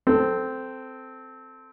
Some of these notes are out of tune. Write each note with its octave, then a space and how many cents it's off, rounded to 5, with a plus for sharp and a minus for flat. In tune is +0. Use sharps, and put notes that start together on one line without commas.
C4 -10 A4 +5